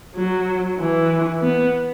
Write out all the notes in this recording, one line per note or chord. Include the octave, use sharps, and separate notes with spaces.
F#3
E3
B3